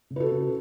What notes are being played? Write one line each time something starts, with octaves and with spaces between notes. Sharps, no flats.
C#3
B4
F#4 A4
C#3